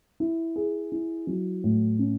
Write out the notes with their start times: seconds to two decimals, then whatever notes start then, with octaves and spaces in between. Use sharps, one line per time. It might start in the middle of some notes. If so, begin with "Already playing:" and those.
0.20 E4
0.56 G#4
0.92 E4
1.27 F#3
1.64 A2
1.99 C#4